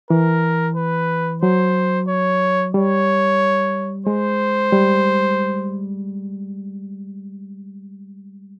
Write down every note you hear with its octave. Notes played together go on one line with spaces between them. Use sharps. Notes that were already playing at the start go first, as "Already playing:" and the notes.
E3 A#4
B4
F#3 C5
C#5
G3 C#5
G#3 C5
G3